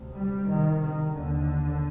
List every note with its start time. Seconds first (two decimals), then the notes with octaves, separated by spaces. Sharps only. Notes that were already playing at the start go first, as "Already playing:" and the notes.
Already playing: D2 C3
0.16 G3
0.48 C2 C3 D#3
0.81 D#3
1.13 D#2 D3